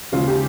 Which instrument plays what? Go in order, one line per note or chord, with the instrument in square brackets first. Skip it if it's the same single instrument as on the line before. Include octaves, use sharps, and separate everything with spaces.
[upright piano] D#2 C#3 G#3 [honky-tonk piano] F4
[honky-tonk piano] G4